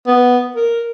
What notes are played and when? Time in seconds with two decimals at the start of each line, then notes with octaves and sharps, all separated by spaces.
0.07 B3
0.56 A#4